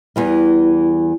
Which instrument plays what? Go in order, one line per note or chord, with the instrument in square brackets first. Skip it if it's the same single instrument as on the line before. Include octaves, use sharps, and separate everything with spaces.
[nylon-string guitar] E2 E3 G3